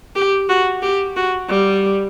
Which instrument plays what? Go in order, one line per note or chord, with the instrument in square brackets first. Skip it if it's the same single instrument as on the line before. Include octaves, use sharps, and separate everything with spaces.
[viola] G4
F#4
G4
F#4
G3